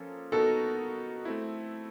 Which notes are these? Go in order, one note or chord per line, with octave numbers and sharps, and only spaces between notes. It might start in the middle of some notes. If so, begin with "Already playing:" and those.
Already playing: F3 A#3 C#4 F4 A4
B3 D#4 F#4 A4 A#4
A3 C4 E4